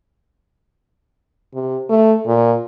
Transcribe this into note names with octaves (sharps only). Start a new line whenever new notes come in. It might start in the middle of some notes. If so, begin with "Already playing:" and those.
C3
A3
A#2